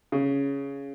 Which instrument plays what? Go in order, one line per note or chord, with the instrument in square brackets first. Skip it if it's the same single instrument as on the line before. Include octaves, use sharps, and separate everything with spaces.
[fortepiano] C#3